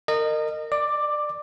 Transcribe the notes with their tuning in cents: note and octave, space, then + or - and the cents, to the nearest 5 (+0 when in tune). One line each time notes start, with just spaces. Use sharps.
A#4 -25 D#5 -25
D5 +20 D6 +5